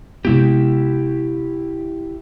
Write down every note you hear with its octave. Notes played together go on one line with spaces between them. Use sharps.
C3 G#3 B3 E4 G4